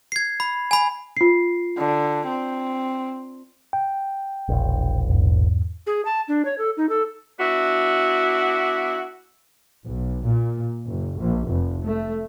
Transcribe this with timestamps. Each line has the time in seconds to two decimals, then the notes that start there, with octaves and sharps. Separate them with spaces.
0.12 G#6 C7
0.40 B5
0.71 G#5 B5
1.17 F4 C7
1.78 D3
2.26 C4
3.73 G5
4.49 E1 A#1
5.10 E2 G#2
5.87 G#4
6.05 A5
6.28 D4
6.45 C#5
6.58 A4
6.77 D#4
6.89 A4
7.40 B3 D4 E4 F#4
9.85 B1
10.25 A#2
10.87 F#1
11.18 A#1
11.47 F1
11.84 A3